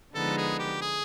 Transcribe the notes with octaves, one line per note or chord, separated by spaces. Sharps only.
D3 F3 G#3 B3 D#4 A4
G#4
G4
G#4